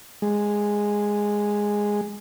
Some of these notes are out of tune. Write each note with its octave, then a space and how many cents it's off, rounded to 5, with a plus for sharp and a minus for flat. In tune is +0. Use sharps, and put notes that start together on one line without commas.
G#3 -10